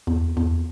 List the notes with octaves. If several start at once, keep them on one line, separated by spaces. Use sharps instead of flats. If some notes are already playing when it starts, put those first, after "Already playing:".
E2
E2